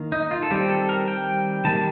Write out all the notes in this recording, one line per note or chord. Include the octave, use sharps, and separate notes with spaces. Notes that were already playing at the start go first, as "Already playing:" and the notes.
Already playing: D#3 A#3
D#4
F4
A4
D#3 G3 C4 G4
A4
A#4
G5
D#3 G3 A#3 A5